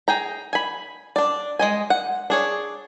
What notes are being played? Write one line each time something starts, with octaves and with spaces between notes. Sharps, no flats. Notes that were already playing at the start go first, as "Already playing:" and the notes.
G#4 G5 A#5
G#5 B5
D4 D5
G#3 D#5 G#5
F#5
D4 G#4 C#5